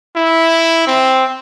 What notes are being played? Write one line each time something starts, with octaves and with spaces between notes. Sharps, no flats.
E4
C4